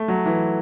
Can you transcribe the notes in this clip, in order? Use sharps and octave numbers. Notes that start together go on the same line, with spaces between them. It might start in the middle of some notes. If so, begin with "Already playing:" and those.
Already playing: A3
F#3
E3